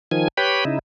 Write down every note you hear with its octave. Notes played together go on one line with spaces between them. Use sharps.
D#3 F3 G#5
G4 B4 C#5 G5 B5
C#3 D#4 E4